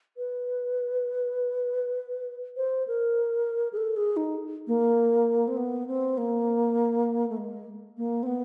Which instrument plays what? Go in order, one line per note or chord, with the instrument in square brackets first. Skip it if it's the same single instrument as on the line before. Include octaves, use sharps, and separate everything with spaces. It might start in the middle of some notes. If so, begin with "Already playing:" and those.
[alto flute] B4
C5
A#4
G#4
A4
G#4
D#4
A#3
C4
B3
C4
A#3
A3
G#3
A#3
C4
B3